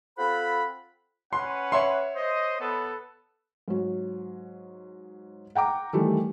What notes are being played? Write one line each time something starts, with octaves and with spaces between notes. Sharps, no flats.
C4 F4 A4 C5 F#5 B5
C#4 B4 F#5 C6
C#5 E5 C6
C5 D#5
B3 A4 B4
G#2 F#3
F#5 G5 A#5 D6
D#3 E3 G3 A3